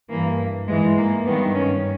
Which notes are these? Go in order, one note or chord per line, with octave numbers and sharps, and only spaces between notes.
G2 E3 A#3
G#2 E3 G#3
A#3
G2 D#3 B3
C#4